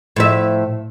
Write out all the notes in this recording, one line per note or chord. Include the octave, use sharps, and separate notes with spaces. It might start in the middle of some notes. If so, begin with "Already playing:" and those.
A2 F3 E5